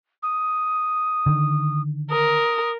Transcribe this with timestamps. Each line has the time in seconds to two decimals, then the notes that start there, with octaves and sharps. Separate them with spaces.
0.23 D#6
1.26 D3 D#3
2.11 A#4 D#6